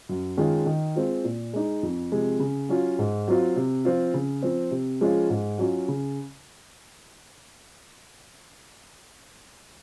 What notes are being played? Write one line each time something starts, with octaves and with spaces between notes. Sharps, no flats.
F#2
D#3 G#3 C#4 F4
D#3
G#3 C4 F4
A#2
G#3 D#4
F2
C3 F3 G#3
C#3
F#3 C#4 F4
G#2
F#3 C4 F4
C3
F3 C4 F4
C#3
F3 C4
C3
F3 G#3 C#4 F4
G#2
F#3 C#4 F4
C#3